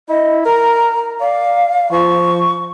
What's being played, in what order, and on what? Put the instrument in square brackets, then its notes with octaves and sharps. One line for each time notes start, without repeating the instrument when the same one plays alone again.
[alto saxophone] E4 [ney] D#5
[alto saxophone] A#4 [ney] A#5
[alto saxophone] D5 [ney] F5
[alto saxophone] F3 [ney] C#6